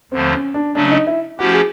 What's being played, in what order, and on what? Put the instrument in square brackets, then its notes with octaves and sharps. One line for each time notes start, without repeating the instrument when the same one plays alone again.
[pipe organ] D#2 D3 F3 A3 [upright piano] C4
[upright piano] C#4
D4
[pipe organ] C#3 F#3 A3 C#4 [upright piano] D4
[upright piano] D4
D#4
E4
[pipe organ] F3 A3 C#4 E4 G4 [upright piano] F#4
[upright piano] G#4